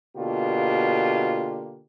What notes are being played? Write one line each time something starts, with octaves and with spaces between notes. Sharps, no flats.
B2 D3 A#3 F4 G4